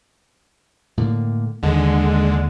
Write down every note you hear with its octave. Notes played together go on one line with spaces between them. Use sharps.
A2 D3 A#3
D#2 D3 G#3